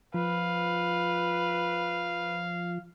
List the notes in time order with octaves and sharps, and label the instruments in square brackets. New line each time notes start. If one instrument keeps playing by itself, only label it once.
[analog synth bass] F3 [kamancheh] B4 [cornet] F5